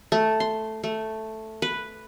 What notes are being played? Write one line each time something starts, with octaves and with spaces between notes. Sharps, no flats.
A3
C6
A3
B4